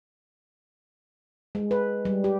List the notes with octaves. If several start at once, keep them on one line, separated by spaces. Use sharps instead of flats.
G#3
B4
G3
G4